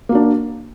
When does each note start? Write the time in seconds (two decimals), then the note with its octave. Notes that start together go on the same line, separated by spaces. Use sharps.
0.09 A#3
0.12 F#4
0.15 D4